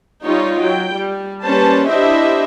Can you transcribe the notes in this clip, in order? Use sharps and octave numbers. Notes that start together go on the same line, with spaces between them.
G3 D#4 F4 C#5
F#3 G5
G3
G3 A#3 C#4 B4 C5 A5
D4 E4 G4 C5 D#5 E5